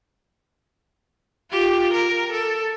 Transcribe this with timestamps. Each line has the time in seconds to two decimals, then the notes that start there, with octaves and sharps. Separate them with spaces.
1.51 F4 G4
1.93 A#4
2.32 A4